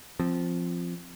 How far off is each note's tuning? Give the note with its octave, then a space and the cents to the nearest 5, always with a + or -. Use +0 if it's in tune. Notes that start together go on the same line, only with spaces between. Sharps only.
F3 -5 C4 +0